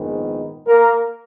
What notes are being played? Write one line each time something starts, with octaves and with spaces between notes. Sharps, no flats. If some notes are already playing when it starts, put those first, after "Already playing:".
Already playing: A#1 G#2 D#3 G#3 B3
A#3 A#4